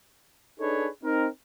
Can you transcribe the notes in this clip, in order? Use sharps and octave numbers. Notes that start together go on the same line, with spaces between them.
D4 D#4 G#4 A4 B4 C#5
C4 D#4 A#4